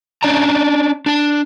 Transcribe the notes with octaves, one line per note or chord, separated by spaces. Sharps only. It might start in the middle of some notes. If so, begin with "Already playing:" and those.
C#4 D4 D5 A5 A#5
D4 A5